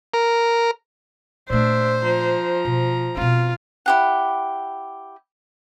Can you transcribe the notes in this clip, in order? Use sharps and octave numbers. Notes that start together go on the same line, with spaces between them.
A#4
A#2 A3 D4 C5 E5
F3 A#5
B2
B2 C4 F4
E4 G4 F#5